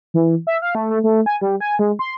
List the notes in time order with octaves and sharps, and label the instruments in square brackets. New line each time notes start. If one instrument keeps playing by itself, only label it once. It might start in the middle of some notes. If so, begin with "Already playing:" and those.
[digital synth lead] E3
E5
F5
A3
A3
A3
G#5
G3
G#5
G#3
C6